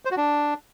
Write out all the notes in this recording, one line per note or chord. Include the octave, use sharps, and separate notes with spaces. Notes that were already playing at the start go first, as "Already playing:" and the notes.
C5
F#4
D4